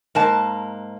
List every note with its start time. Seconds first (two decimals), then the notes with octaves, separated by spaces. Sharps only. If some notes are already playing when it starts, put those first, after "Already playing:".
0.15 G#2 A#3 A5